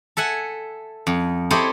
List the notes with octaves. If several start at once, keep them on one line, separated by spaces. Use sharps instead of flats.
A4 E5 F#5 G#5
F2
E4 G4 A4 C5 C#5 D#5